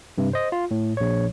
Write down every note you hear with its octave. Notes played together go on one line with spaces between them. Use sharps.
G2 C3
C5 D#5
F4
A2
A#1 C#5